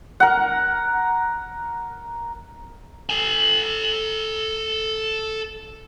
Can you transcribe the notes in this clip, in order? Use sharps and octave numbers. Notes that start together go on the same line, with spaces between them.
A#4 F#5
A4 G#5